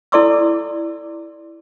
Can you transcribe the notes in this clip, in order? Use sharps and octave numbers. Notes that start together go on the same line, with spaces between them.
E4 A4 D5 C6 D6 E6